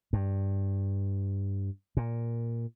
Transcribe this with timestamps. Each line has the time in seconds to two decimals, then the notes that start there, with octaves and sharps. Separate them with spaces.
0.13 G2
1.97 A#2